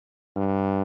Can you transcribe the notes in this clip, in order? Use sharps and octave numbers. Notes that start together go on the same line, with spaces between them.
G2